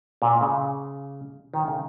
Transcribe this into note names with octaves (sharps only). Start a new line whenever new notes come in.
A#2
C#3
D#3
C#3